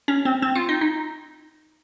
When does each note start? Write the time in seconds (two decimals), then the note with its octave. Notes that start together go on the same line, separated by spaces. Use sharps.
0.08 C#4
0.25 C4
0.42 C4
0.55 F4
0.69 D#4
0.81 D#4